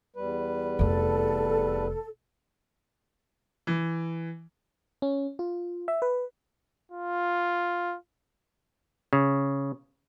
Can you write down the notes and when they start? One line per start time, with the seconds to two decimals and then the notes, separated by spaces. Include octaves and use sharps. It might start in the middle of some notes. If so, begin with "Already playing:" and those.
0.16 E2 G3 B4
0.79 F1 E4 A4
3.67 E3
5.02 C#4
5.39 F4
5.88 E5
6.02 B4
6.92 F4
9.13 C#3